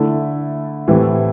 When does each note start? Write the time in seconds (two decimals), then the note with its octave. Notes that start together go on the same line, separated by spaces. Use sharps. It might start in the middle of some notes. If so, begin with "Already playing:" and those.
Already playing: D3 A3 E4 A4
0.88 A2 E3 A3 C4 G4